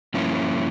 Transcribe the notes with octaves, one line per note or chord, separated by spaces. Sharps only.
G2 F3 A#3 C#4 E4